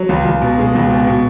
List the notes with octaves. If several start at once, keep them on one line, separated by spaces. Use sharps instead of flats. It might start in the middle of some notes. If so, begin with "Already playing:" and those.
Already playing: F#3
C#2
C#2
B2
G#3
C#2
B2
B2